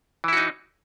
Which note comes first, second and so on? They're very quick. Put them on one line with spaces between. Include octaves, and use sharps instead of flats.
E3 E4 F#4 D#4